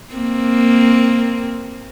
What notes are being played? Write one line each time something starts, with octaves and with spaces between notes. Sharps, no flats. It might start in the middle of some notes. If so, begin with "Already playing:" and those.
A#3 C4